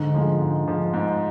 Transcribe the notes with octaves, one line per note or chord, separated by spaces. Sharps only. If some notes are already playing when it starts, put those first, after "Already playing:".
Already playing: G#2 D3
F3 G#3
G#2
F3 G#3
G#2